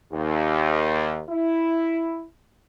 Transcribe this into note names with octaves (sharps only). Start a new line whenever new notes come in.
D#2
E4